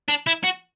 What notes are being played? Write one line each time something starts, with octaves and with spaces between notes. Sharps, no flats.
D4
E4
F#4